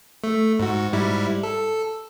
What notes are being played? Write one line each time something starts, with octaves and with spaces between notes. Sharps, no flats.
A3
G#2 F#4
G#2 G3 E4
A4